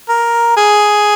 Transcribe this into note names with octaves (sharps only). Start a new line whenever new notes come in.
A#4
G#4